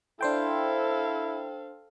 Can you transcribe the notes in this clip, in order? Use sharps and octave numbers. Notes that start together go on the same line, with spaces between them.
D4 E4 A4 C5 F5 G5